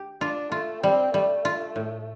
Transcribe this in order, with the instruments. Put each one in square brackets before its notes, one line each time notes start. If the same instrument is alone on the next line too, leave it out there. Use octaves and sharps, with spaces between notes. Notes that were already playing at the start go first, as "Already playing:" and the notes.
Already playing: [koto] G4
[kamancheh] D4 [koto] F4
[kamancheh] A3 [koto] F4
[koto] G3 [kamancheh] C4
[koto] G3 [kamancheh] A3
[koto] F4
A2